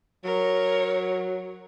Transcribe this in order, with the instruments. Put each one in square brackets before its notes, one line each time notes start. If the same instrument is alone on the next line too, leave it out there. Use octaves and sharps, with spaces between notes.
[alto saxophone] F#3 [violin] A#4 C#5